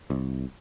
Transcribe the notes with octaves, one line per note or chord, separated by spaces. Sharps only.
C2